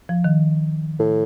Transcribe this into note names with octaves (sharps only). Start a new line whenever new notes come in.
F3
D#3
A2